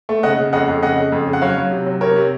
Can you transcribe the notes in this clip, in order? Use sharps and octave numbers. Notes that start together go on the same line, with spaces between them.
A3
C#3 D#5 F#5
C#3
F2 D#5 F#5
F2
C#3 D#5 F#5
C#3
F2
C#3
F#5
F#3 C#5 F5
F#3
C3
F#3
C3 A#4 C#5
C3